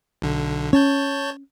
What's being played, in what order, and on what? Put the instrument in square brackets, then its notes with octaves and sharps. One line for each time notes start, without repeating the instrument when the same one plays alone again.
[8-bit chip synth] B1 D3
[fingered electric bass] C#4 [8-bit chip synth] C#5 A5 G6